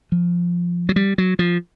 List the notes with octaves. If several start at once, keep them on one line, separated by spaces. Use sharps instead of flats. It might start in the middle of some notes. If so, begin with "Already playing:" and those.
F3
F#3
G3
F#3
F3